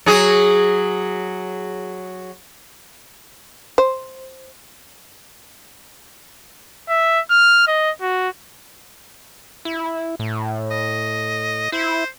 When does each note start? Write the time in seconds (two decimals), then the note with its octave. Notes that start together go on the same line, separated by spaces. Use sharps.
0.06 F#3 G#4
3.78 C5
6.89 E5
7.31 F6
7.68 D#5
8.02 F#4
9.65 E4
10.19 A2
10.71 D#5
11.72 E4 C5